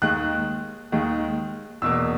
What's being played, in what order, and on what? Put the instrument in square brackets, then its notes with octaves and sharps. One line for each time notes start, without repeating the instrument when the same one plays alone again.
[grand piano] D#2 D#3 G#3 F#6
D#2 D#3 G#3
E2 B2 A#3 E6